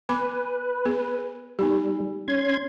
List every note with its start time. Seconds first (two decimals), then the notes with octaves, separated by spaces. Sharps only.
0.09 B3 B4 B5 D6
0.85 B3 G#4
1.59 G3 B3 D#4 G4
2.28 C#4 C6 G#6